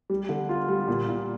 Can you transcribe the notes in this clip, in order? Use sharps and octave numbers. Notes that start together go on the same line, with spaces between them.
G3
D3
F4
G3
A#2
A#2